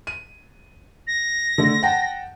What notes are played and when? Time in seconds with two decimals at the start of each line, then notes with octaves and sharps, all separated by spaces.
0.07 D#7
1.07 A#6
1.58 D3 A3
1.83 F#5 G5 A5